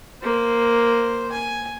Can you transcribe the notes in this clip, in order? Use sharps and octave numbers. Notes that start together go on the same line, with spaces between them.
A#3 C5
G#5